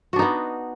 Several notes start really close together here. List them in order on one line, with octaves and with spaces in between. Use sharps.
F#4 D4 D#4 B3